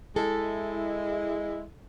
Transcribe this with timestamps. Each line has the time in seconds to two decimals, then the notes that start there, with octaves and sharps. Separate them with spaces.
0.16 G#3 E4 A4